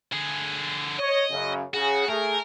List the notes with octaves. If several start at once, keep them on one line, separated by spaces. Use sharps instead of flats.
D3 G#4
C#5 D#5
F#2 C#3
C#3 F#4 G#4
A3 G#4 A#4